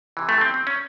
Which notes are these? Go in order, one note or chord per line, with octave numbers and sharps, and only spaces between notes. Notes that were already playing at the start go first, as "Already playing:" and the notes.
C3 E3
A3
C4
C4
C#4